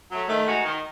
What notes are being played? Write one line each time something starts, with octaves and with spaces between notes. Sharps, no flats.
F#3 A3
D#3 A3
G#3 D#4 F#4
D#3